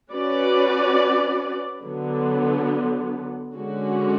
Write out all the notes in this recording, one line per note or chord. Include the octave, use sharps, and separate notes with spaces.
C#4 F#4 B4 D5
D3 F#3 B3
D3 G#3 C#4 F#4